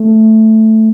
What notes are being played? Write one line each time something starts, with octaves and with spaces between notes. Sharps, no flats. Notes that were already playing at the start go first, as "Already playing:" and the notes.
Already playing: A3